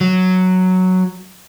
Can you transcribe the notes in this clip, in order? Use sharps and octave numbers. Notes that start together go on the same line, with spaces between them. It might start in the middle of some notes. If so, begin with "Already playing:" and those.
F#3